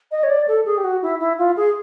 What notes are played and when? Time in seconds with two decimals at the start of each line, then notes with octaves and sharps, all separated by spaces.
0.12 D#5
0.23 C#5
0.30 D5
0.48 A4
0.66 G#4
0.78 G4
0.84 F#4
1.02 E4
1.20 E4
1.38 F4
1.57 G#4